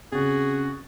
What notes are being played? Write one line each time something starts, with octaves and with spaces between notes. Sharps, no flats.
C#3 C4 F#4 G#4 A6